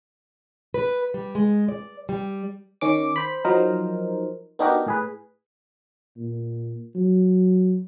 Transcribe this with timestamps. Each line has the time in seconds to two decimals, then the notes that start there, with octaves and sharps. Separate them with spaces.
0.74 B4
1.14 G3
1.35 G#3
1.69 D5
2.09 G3
2.81 D#3 C#4 D6
3.16 C5 B5
3.44 F3 F#3 D#4 A#4 C5
4.59 B3 D4 D#4 F#4 G4 A#4
4.86 A2 G#4 B4
6.17 A#2
6.95 F#3